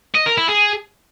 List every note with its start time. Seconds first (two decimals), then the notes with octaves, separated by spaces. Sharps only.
0.15 D#5
0.26 A#4
0.37 E4
0.48 G#4